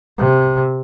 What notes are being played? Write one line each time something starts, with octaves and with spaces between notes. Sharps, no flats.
C3